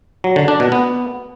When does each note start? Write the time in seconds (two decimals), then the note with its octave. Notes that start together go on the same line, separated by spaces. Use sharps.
0.24 F#3
0.36 D3
0.48 D4
0.60 B2
0.72 B3